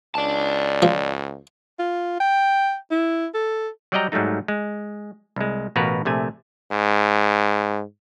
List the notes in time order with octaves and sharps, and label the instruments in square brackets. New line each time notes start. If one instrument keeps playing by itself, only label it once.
[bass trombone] C#2 [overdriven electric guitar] D5 A5
[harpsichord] F3
[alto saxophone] F4
G5
E4
A4
[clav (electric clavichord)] F#3 G3 D5 D#5 G5 A#5
G#2 F#3 G3 A3 D#4
G#3
C2 G#3
A1 B2 F#4 A#4 B4 F5
A#1 C3 A3 G#5
[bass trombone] G#2